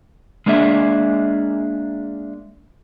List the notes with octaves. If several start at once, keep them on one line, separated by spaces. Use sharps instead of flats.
G#3 A#3 D4 G#4 E5